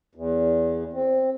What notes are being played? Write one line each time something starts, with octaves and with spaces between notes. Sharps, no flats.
E2
C4